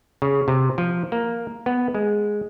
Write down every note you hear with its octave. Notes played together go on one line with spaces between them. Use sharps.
C#3
C3
F3
A#3
B3
G#3